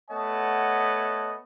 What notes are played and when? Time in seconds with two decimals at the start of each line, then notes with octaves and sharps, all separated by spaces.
0.11 A3 B3 C#5 D#5 F#5 A5